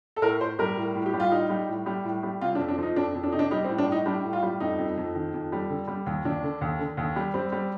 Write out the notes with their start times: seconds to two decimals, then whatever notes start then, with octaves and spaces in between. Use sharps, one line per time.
0.16 A4
0.22 A2 A#4
0.41 A2 C5
0.59 G3 A#4
0.78 A2
0.95 A2
1.06 G4
1.14 G3
1.20 F4
1.31 A2 D#4
1.50 G3
1.69 A2
1.86 G3
2.05 A2
2.23 G3
2.41 C3 F4
2.55 D4
2.59 F2
2.68 D4
2.78 F3 D#4
2.96 F2 D4
3.15 F2
3.23 D4
3.32 C3 D#4
3.39 D4
3.51 G3 D#4
3.64 C4
3.69 A2
3.78 D4
3.88 A2 D#4
4.06 G3 D4
4.24 A2
4.33 F4
4.43 G3
4.60 F2 D#4
4.79 F2
4.97 F2
5.15 D#3
5.34 F2
5.52 G3
5.70 D3
5.88 G3
6.06 D#2
6.25 D#2 D4
6.43 D3
6.61 D#2
6.79 D3
6.97 D#2
7.16 G3
7.34 G3 C4
7.52 G3